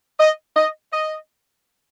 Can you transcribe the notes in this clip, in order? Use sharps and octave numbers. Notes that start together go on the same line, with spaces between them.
D#5
D#5
D#5